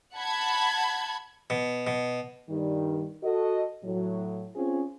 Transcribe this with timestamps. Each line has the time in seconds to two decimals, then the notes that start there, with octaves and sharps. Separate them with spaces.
0.14 F#5 A5 B5 G#6
1.50 B2
1.87 B2
2.50 G2 D#3 G3
3.23 F#4 A4 D#5
3.84 A2 F#3
4.55 C4 C#4 F4 G#4